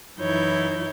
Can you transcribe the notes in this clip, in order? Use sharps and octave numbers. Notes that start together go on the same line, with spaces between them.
F#2 E3 D#4 E4 C#5 G6